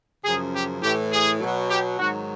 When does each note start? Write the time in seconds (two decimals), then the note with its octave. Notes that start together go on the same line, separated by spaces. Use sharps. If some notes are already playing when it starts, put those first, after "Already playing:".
0.24 F#2 C#3 F3 G#4
0.53 G4
0.82 A2 E3 G4
1.11 G#4
1.40 B2 F#3
1.69 G4
1.98 G#2 D#3 F#3 F#4